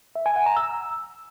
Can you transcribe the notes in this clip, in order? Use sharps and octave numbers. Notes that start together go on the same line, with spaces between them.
E5
G#5
F#5
A#5
E6